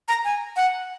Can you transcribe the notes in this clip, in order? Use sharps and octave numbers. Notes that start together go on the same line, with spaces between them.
A#5
G#5
F#5